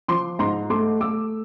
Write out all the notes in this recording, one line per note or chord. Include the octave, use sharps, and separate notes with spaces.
F3 C6 D6
G#2 A#5 C6
A3 C6 D6
A3 D6 E6